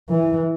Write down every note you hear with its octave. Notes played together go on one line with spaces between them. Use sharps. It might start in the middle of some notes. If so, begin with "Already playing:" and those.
E3